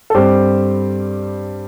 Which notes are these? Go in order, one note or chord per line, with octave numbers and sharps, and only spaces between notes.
A4
G2 G3 C4 G4 C5